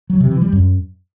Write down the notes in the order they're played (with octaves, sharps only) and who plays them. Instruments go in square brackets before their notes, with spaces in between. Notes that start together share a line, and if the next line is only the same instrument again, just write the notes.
[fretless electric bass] F#3
C3
E3
G3
F#2